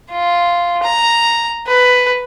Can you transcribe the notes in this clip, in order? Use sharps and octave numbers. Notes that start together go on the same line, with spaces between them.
F4
A#5
B4